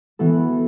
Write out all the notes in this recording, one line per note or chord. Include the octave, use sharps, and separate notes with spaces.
E3 B3 F#4 A4